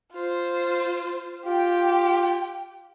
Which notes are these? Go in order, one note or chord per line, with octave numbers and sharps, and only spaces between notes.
F4 C5
F4 G4 G5